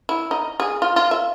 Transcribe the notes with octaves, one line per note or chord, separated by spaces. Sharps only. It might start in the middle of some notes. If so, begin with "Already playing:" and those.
E4
D#4
G#4
F4
F4
E5